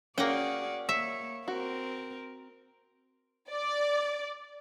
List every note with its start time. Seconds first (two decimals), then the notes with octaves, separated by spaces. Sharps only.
0.18 A#3 C#4 F#4 G#4 D5 F#5 G5
0.89 A#3 C#5 E5
1.48 C4 F#4 A#4
3.50 D5